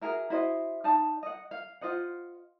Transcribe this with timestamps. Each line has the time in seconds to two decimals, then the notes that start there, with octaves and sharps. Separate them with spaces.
0.01 F#4 G#4 A#4 E5
0.30 E4 F#4 C5 D#5
0.84 D#4 D5 F5 A5
1.23 D#5 F#5
1.51 F5
1.81 F4 C5 D#5 F#5